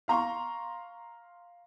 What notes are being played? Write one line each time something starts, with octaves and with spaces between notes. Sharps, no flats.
F5 A#5 C6 C#6